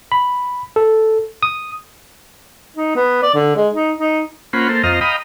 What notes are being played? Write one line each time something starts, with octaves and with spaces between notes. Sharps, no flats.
B5
A4
D#6
D#4
B3
D5
D3
G#3
D#4
D#4
A#3 C#4 F4 C5 F#5 B5
A#3 A4 C5
F2 C5 D#5 F5 A#5
D#5 F5 G5 A#5 B5 D#6